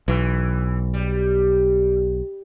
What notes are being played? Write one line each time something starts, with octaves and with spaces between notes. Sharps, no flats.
B1 E3
G3